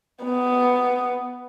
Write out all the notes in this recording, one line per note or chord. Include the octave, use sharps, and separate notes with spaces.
B3